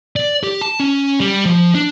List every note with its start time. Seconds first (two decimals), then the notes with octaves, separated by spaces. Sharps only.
0.16 D5
0.43 G4
0.61 A5
0.80 C#4
1.20 G3
1.45 F3
1.75 D4